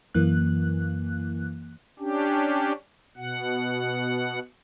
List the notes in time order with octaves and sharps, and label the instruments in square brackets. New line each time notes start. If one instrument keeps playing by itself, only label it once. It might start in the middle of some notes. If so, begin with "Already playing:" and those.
[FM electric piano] F#2 E3 A#3 F#6
[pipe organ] C#4 D4 G4
B2 F#5